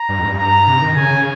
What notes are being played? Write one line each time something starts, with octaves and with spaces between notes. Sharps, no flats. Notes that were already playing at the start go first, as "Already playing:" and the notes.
Already playing: A#5
G2
F2
G#2
G2
A#5
C3
D#3
C#3 G#5